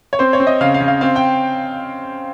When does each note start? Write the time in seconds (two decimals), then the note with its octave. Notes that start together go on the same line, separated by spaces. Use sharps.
0.13 C#5
0.19 C4 C5
0.33 C#5
0.40 C4
0.47 D#5
0.61 C#3 F5
0.74 F5
0.80 C#3
0.88 F5
1.01 C4 F5
1.16 G5